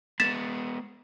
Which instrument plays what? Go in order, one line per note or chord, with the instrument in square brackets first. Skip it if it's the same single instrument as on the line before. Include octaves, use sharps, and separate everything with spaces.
[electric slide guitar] G#3 A#3 B3 [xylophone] A6 B6 E7